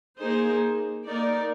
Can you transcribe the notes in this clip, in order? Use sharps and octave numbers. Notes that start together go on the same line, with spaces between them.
A#3 D#4 G#4 C5
A#3 D#4 A#4 D5